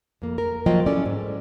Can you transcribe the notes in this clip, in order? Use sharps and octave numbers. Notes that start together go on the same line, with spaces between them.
F2 A#3
A#4
F3 F#3 A#3 F4 D#5 G5
C#4 E4 A4 D5
G#2